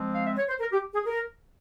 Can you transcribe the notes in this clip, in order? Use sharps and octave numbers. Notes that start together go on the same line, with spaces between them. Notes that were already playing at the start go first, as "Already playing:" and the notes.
Already playing: F3 G#3 C4
F5
E5
C#5
C5
A#4
G4
G#4
A#4